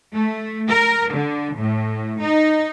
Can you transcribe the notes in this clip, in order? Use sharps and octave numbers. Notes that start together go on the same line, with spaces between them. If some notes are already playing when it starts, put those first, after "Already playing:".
A3
A#4
D3
A2
D#4